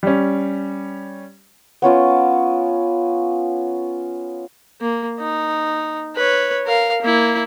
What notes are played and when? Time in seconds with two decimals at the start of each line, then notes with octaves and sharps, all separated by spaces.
0.03 G3 C#4
1.82 B3 C#4 F4 D6
4.81 A#3
5.19 D#4
6.15 B4 C#5
6.66 A#4 F5
7.02 A#3 E4